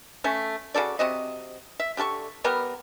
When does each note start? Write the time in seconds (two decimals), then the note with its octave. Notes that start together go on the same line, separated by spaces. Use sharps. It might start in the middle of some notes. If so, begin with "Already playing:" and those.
0.24 A3 C#4 A4
0.74 C#3 F#4 A4 D5
0.99 C3 C4 F#4 D#5
1.80 E5
1.97 D3 G4 A4 C#6
2.44 G3 B3 G4 A#4